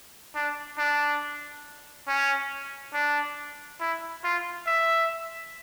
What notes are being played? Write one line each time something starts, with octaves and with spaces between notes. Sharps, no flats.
D4
D4
C#4
D4
E4
F4
E5